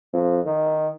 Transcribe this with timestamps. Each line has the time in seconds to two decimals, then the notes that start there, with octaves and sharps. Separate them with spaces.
0.13 F2
0.46 D#3